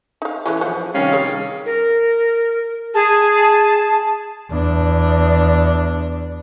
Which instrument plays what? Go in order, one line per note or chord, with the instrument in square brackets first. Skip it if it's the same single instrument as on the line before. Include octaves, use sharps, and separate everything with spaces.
[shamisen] D#4 F5
[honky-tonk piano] E3 [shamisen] G#3 A3 C#4
[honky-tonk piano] F3 [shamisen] C5 F#5
[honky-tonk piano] C3 D#3 G3 [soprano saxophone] C#4 [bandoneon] F5
[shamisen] G#4 C#5
[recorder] A#4
[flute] G#4 [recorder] A5
[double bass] E2 D4